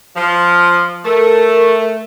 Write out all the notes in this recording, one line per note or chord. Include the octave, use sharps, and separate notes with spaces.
F3
A3 A#4